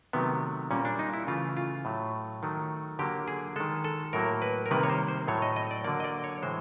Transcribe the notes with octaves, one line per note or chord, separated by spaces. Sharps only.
C3 D#3 F#3 A3 B3
A#2 G3 A#3 C#4
D4
D#4
E4
C#3 E3 A3 F4
F4
A2 F#3 A3
D#3 F#3 A3
D3 F#3 A#3 G4
G#4
D#3 G#3 A4
A4
A2 F#3 A#3 A#4
B4
A#4
C3 D#3 G3 A#3 B4
C#5
C5
C5
A2 F#3 A3 C#5
D#5
D#5
D5
D3 F#3 A#3 D5
D#5
D5
C#5
A2 E3 G#3 C5